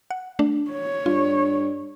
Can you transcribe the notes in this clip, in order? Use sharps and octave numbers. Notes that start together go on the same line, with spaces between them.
F#5
A3 D4
C#5
G2 F4